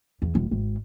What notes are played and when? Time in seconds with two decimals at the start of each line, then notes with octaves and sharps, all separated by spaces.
0.22 E2
0.35 D#1
0.51 G#1